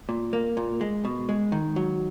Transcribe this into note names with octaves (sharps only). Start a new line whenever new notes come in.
A#2
A#3
A#2
G#3
B2
G#3
D#3
F#3